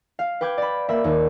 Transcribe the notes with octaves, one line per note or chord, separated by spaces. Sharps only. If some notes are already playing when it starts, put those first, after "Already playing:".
F5
B4 G5 D6 G6 G#6
D5 B5
A#3 E5 B5
D#2